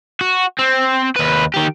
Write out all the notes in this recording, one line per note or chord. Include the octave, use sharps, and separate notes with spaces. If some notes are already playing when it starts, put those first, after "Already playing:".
F#4
C4
D#2 B4
D#3 G4